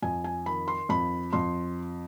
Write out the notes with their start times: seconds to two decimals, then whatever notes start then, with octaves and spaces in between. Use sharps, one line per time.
0.02 F2 G#5
0.24 G#5
0.46 D#3 B5
0.68 C6
0.89 F2 B5
1.33 F2 C6